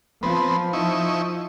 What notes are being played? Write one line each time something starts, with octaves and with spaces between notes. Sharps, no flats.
F3 B3 C4
D#4 E4 C#6